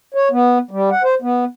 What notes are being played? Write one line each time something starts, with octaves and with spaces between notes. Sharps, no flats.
C#5
B3
G3
F#5
C5
B3